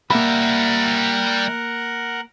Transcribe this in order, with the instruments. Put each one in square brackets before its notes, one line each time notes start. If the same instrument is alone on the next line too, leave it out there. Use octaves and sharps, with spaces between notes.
[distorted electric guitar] G3 E5 [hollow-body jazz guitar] A#3 B5 [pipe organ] A#4 F#5